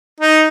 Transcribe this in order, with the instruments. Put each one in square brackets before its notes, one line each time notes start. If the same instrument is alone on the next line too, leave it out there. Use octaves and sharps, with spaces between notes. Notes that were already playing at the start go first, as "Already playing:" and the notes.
[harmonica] D#4